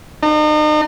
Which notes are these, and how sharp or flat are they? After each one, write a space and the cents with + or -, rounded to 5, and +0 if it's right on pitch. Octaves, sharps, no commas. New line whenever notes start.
D#4 -40